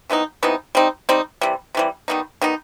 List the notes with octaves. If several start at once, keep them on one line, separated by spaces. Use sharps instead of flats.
C3 E3 B3 D#4
C3 E3 B3 D#4
G3 C4 D#4
G3 C4 D#4
C3 E3 G3
C3 E3 G3
D#3 G3 B3 D#4
D#3 G3 B3 D#4